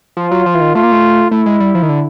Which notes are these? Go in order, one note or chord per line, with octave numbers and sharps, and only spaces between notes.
F3 F4
F#3
F3
E3
D#3
A3 F4
A#3
A3
A3 E4
G#3
G3
F3
D#3
D3